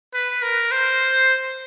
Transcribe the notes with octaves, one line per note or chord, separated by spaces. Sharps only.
B4
A#4
C5